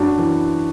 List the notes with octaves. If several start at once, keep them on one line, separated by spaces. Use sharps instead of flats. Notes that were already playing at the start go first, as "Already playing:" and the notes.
Already playing: F#2 D4 F#4
E3